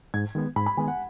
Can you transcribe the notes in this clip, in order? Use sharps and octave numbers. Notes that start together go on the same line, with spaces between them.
G#2 G#6
D#3 G#3 B3
G#2 B5
B5
D#3 G#3 B3 G#5
F#5